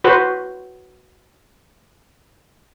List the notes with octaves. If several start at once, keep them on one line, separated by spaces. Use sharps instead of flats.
F#4 B4 C5